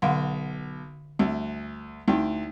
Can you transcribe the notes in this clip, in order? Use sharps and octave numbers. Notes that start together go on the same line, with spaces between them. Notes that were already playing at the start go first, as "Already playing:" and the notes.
B1 D3 F5 F#5
D2 G3
D2 D#4 E4 G5